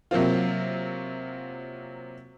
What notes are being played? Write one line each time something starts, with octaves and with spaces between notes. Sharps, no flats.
C3 F#3 A#3 C4 F4